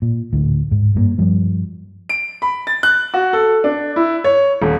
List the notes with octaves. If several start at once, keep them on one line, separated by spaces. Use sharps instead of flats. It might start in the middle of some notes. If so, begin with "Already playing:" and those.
A#2
D2 A2
G#2
G2 E3 A#3
G2 F3 G3
D7
B5
A6
F#6
F#4
A4
D4
E4
C#5
D#1